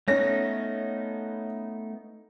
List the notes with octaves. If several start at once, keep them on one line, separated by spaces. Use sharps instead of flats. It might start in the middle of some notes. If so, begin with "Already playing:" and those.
A3 B3 C#4 D#4 A#6